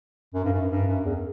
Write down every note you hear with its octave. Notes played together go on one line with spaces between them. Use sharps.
F#2
G2
F#2
G2
F#2
E2